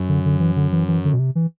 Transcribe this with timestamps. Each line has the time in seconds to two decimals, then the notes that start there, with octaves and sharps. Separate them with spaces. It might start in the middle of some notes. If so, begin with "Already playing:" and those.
Already playing: F#2
0.09 D3
0.25 D3
0.40 E3
0.56 D3
0.72 E3
0.88 E3
1.05 D3
1.14 B2
1.19 C3
1.35 E3